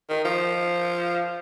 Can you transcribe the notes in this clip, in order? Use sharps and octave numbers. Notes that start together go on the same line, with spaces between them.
D#3
F3